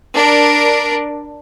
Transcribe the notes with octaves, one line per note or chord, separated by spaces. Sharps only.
D4 A#4